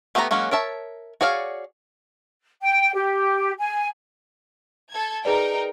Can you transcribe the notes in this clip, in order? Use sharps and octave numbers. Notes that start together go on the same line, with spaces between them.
A3 B3 G4 A4 A#5
F#3 G#3 A#3 C#4 F#4
A#4 C#5 E5 A5
F#4 G#4 C#5 D5 F5
G5
G4
G#5
A4 G#6
D#4 G#4 A#4 B4 D5 G5